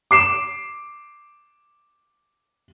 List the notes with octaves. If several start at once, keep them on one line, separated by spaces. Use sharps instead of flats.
D6 C7 E7